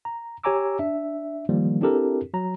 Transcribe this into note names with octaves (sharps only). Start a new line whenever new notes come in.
A#5
G4 C#5 G#5 A#5 D6 E6
D4 E5
D#3 F3 G3 A#3
C4 D4 E4 G4 A4 A#4
F#3 A#5